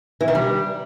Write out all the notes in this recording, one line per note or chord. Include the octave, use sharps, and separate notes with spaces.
E3
D#3
G3